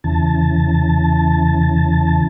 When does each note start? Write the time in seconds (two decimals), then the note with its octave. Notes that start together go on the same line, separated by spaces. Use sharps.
0.04 E2 C#3 E3 A5